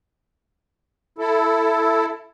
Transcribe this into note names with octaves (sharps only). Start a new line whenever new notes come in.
E4 A4